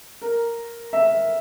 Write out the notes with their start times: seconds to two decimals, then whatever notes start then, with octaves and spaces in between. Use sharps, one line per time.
0.22 A#4
0.93 E5